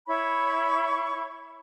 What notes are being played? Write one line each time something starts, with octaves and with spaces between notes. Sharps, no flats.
E4 C#5 B5 C#6